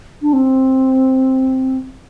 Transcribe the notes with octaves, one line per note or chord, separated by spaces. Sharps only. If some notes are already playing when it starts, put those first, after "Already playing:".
D4
C4